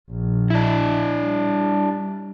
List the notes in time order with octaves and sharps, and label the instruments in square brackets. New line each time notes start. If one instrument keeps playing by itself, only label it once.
[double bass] A#1
[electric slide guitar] D4 E4
[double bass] G3